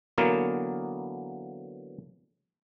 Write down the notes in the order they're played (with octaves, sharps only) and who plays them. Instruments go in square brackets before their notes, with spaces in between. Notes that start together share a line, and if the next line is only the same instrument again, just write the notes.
[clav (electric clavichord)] D3 E3 F#3 A#3 B3 A#4